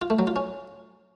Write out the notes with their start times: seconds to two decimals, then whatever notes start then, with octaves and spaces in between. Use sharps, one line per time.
0.02 F4
0.10 A3
0.19 F#3
0.27 F4
0.36 C#4